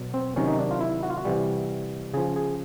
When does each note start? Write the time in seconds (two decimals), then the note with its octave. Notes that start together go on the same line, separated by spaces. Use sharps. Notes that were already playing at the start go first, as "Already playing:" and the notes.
Already playing: B2 F#3
0.14 C4
0.36 C3 D#3 F#3 C#4
0.48 D#4
0.59 D4
0.71 F4
0.81 E4
1.03 F#4
1.10 F4
1.17 F#4
1.25 C3 E3 G3
2.14 C#3 F3 G#4
2.36 G#4